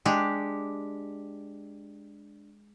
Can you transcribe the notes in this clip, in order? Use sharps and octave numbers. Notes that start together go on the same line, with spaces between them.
G#3 D4 G4